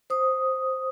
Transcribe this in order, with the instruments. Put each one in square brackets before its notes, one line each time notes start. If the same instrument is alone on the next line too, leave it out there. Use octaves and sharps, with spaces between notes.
[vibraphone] C5 D#6